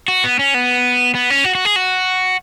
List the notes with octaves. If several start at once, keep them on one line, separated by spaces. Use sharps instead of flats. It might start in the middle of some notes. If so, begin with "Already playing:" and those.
F#4
B3
C#4
B3
B3
C#4
F#4
F#4
G#4
F#4